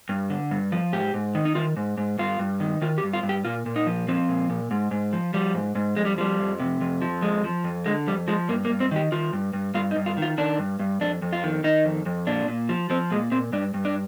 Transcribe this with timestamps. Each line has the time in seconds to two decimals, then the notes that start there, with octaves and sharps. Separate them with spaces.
0.09 G2
0.30 D3
0.51 G2
0.72 F3
0.93 G#2 G4
1.14 G#2
1.35 D#3
1.45 D#4
1.55 D#3 F4
1.77 G#2
1.98 G#2
2.18 G2 F4
2.39 G2
2.60 D#3
2.82 D#3 F4
2.98 G4
3.03 G2
3.13 F4
3.23 G2
3.29 G4
3.45 A#2 F4
3.66 A#2
3.76 D#4
3.87 F3
4.08 F3 C4
4.29 A#2
4.50 A#2
4.71 G#2
4.91 G#2
5.13 F3
5.34 F3 G3
5.55 G#2
5.75 G#2
5.97 F2 G#3
6.05 G3
6.18 F3 G3
6.39 F2
6.60 C3
6.81 F2
7.02 F3
7.22 F2 G#3
7.44 F3
7.64 F2
7.86 D3 G#3
8.07 F2 G3
8.28 F3 G#3
8.49 G2 A#3
8.65 A#3
8.70 G2
8.80 C4
8.91 D#3 G4
9.12 D#3 F4
9.33 G2
9.53 G2
9.74 G2 F4
9.91 D#4
9.96 G2
10.06 F4
10.17 D#3
10.22 F4
10.38 D#3 D4
10.59 G2
10.79 G2
11.01 F2 D4
11.22 F2
11.33 F4
11.44 D#3
11.64 D#3 D#4
11.85 F2
12.06 F2
12.27 A#2 D4
12.48 A#2
12.69 F3
12.90 F3 C4
13.11 A#2 G#3
13.31 A#2 C4
13.53 G2 D4
13.74 G2
13.85 D4